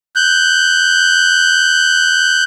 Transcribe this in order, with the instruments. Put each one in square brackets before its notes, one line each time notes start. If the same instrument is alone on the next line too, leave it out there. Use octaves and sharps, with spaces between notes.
[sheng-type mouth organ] F#6 G6